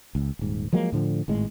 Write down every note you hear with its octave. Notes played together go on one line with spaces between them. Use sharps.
C#2
D#1 G#2
F3 F#3 G#3 A#3
A2 D3 F3
G#1 A2 G#3